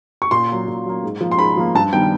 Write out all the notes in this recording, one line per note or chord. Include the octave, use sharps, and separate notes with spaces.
C#6
A#2 C6
F#3 A#3
A#2
F#3 A#3
G#2
F3 A#3
C6
G#2 B5
F3 A#3
G2 A5
D#3 G3 B3 G5